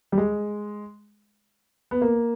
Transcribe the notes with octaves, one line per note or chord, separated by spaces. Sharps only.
G3
G#3
B3
A#3